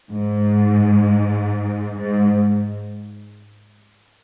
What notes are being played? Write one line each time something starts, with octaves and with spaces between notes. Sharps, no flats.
G#2
G#2